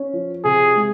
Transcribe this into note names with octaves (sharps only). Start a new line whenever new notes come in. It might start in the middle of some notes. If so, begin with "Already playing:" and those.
Already playing: C#4
F3
C3 G#4
G#3